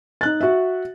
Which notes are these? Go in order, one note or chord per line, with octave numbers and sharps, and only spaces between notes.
D#4 F#6 A6
F#4 E5